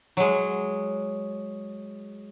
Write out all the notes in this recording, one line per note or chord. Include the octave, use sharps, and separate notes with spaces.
F#3 G#3